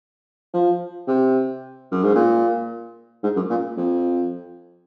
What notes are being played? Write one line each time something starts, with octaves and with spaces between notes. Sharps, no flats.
F3
C3
F#2
G#2
A#2
G#2
F#2
A#2
F2